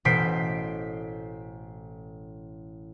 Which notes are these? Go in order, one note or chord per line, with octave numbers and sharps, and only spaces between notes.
A1 B2 C5 B6 C7 D7